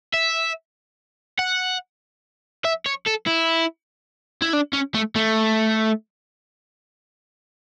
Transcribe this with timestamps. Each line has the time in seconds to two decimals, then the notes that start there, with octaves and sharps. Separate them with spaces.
0.14 E5
1.39 F#5
2.65 E5
2.86 C#5
3.07 A4
3.27 E4
4.42 E4
4.53 D4
4.73 C#4
4.95 A3
5.16 A3